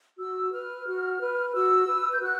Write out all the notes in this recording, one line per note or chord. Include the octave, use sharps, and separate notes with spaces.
F#4 E6
B4 F6
F#4
B4
F#4 E6
B4
G6
F#4 F#6